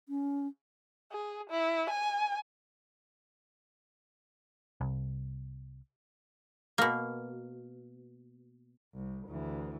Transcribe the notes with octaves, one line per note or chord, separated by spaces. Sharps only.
C#4
G#4
E4
G#5
C2
B2 A#3
C2
D2 E3